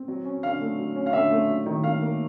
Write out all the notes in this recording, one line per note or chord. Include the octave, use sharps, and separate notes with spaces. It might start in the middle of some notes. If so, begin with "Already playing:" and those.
Already playing: C4
F#3
C#4
D3 F5
A3
F#3
C#4
F5
D3 E5
A3
F#3
D#3
D#3 F5
A#3